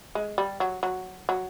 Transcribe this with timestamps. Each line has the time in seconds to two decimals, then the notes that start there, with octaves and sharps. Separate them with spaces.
0.15 G#3
0.38 G3
0.60 F#3
0.83 F#3
1.29 F#3